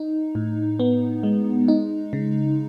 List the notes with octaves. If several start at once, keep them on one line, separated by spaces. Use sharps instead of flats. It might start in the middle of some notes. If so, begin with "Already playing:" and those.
Already playing: D#4
A2
B3
G#3
D#4
C#3